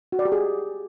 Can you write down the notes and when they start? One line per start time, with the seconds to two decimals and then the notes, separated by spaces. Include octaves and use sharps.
0.12 F#4
0.19 D5
0.25 G4
0.32 G#4